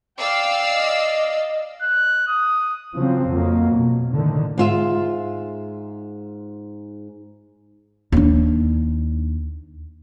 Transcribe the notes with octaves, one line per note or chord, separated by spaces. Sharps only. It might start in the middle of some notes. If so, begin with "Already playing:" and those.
D5 F5 G5 E6
D#5
F#6
D#6
C#3 F3 F#3 C4
F2 F#3 A#3
B2
A2 D3 D#3
G#2 F4 E5
D#2 D4